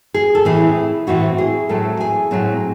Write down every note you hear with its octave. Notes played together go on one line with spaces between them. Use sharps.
G#4
A4
A2 E3 C4 E4 G#4
A2 E3 C4 E4 F#4
G#4
A2 F#3 A3 C4 A4
G#4 G#5
A2 F#3 C4